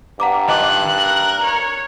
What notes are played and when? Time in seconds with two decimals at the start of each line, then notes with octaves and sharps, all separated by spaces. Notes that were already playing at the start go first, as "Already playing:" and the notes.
0.20 G2 F#5 A#5 D6
0.49 D#3 F4 D#5 A5 D6 F#6
0.98 A#4
1.44 C#5